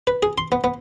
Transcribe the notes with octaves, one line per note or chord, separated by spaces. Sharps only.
B4
G#4
C6
B3
B3